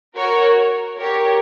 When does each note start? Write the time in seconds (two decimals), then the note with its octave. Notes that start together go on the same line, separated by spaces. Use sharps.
0.16 F#4 A#4 C#5
1.00 G4 A#4 C#5